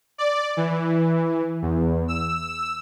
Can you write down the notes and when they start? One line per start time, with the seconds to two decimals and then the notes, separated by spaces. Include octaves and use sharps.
0.18 D5
0.57 E3
1.62 E2
2.08 E6